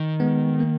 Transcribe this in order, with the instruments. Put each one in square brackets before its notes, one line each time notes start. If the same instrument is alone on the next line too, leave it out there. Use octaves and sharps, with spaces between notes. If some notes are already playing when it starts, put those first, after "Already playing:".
Already playing: [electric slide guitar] D#3
[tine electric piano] G#3 B3
A#3